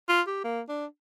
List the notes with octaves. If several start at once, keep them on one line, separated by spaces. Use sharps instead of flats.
F4
G4
A#3
D4